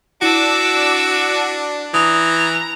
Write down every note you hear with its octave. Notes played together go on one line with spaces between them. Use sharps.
D4 E4 F#4 D6 E6
E3 A#5 D#6